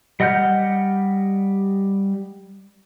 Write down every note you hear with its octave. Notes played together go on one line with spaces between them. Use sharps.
G3 D#5 F#5 F6 G6